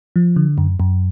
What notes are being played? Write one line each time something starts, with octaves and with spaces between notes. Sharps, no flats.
F3
D3
F#2
F#2